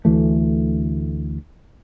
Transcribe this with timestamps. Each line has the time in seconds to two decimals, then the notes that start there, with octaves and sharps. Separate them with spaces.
0.05 D2 D3 E3 A3